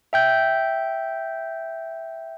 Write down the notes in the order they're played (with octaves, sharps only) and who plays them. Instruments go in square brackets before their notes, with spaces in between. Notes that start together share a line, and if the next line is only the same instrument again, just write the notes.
[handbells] E5 G5 G6